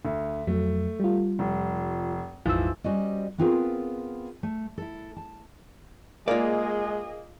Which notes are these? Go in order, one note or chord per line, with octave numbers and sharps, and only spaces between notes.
D2
F2 F#3 A3
G3 F4
F1
A#1 F2 G#2 E3 F3 E6
G3 C#4 F#4 C5 D5 D#5
B3 C4 F4 G#4 A#4 B4
A3
E4 A4
A5
G#3 A#3 F4 G#4 D5 D#5